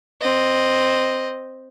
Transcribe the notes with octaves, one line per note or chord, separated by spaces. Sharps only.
C4 D#5